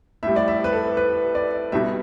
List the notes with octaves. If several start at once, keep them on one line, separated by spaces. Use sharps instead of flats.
A2 G3 E5
D5
E5
B4
A4
B4
D5
B2 G3 E5